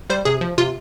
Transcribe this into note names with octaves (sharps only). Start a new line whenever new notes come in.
G3 C5
C3 G#4
F3
C3 F4